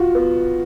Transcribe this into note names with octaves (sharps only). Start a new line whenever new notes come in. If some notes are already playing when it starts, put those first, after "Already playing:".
Already playing: F4 F#4
B3